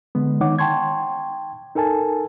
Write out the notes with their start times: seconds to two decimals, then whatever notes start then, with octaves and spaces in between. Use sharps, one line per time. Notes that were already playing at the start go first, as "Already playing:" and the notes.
0.15 D3 G#3 B3
0.41 D#3 D#4 C#5 F#5 D6
0.59 G5 A5 C6 C#6 G#6
1.75 D#4 A4 A#4 G#5 A5